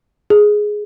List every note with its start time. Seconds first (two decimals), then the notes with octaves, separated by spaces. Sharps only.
0.30 G#4